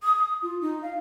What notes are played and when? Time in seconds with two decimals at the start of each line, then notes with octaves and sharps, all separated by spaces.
0.03 D#6
0.16 D#6
0.42 F4
0.61 D#4
0.83 F5